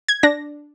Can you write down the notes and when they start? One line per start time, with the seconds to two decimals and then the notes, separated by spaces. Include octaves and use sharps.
0.08 G#6
0.23 D4 A#6